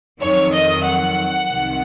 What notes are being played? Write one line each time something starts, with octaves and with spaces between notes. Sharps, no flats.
F2 D#3 F#3 C#5
D#5
F#5
C2 C3 D#3